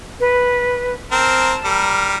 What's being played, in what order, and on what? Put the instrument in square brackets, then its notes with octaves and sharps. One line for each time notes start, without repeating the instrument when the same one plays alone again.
[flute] B4
[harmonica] C4 A#4 [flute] A5
[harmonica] G3 A#4